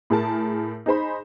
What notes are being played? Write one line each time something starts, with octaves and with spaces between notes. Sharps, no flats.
A2 G#4 A#4 A5
D#4 G#4 C5 B5